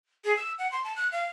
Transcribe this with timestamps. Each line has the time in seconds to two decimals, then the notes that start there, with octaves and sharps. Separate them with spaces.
0.25 G#4
0.36 E6
0.59 F#5
0.72 C6
0.84 A5
0.96 F#6
1.12 F5